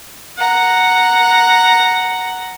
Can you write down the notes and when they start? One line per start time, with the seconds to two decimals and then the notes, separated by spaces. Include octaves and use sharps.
0.38 F#5 A#5